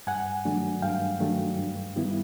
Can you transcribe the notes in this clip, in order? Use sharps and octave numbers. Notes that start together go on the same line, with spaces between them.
G2 F#5 G#5
D#3 F#3 A3 D4
G2 F5 G5
D#3 F#3 A3 D4
G2
D#3 G3 B3 E4